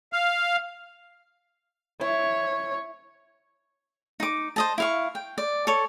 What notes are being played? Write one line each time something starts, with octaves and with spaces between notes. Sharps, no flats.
F5
E4 C#5
D#4 D6
C5 D#5 A5
E4 F5 C#6
G5
D5
A4 C#5